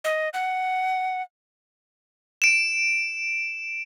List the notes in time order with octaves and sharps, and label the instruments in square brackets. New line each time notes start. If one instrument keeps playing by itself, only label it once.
[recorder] D#5
F#5
[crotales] D7 E7